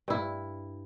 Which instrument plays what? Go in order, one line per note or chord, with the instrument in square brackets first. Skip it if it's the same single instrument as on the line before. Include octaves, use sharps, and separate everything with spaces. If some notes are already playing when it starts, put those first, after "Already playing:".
[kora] G2 E4